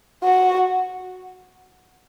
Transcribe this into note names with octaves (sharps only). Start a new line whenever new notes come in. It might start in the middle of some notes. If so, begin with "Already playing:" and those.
F#4